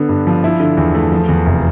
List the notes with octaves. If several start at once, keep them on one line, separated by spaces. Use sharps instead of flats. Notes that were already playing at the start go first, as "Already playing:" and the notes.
Already playing: D3 B3
G2
F3
E4
D3
E2
A3
F3
E2
F1